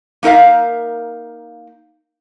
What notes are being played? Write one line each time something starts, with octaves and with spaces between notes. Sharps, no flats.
A#3 D#4 A#4 E5 F5